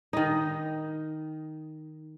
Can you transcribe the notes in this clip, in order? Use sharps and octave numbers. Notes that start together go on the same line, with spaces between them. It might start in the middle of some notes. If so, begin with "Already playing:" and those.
D#3 D#4